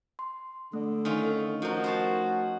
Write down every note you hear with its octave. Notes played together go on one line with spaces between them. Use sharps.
C6
D3 A3 A4
D#3 C#4 F4
F3 D#4 F#4 A#4
C5 C#5 A5